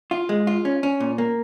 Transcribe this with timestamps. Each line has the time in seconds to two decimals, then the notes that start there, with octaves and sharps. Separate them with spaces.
0.11 F4
0.29 G#3
0.47 F4
0.65 C#4
0.83 C#4
1.00 A#2
1.18 A#3